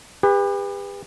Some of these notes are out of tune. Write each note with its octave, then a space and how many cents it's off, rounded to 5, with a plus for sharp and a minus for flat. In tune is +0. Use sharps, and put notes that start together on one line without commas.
G4 +40 B4 +0